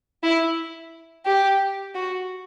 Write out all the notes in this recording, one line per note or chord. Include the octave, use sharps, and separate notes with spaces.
E4
G4
F#4